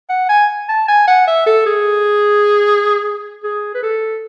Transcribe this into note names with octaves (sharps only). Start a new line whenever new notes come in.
F#5
G#5
A5
G#5
F#5
E5
A4
G#4
G#4
B4
A4